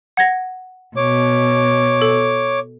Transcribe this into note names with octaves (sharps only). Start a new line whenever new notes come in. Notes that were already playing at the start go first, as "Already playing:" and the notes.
F#5 G#6 A#6
B2 C#5 D6
A4